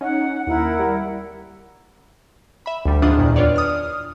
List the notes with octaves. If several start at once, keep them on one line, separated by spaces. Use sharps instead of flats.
C#4 D#4 F#5
D#2 E4 A#4 F#5
G3
E5 B5
D2 G3
G#2 E3 D4 F4 F#5 D#6
E2 A#2 D#3
D4 E4 F4 B4 C#5 D5
D#6 F6